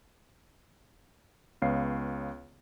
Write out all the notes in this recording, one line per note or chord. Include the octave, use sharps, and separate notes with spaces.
C#2 B3 C#5 F5 C7